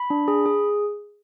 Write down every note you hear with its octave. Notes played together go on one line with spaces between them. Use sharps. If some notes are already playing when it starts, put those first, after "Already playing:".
Already playing: B5
D4
G#4
G#4